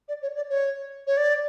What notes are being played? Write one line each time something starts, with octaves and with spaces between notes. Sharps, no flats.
D5
C#5
D5
C#5
C#5
D5